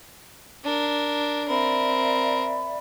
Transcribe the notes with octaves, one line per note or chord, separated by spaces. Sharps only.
D4 A#4
C4 A#4 D5 E5 B5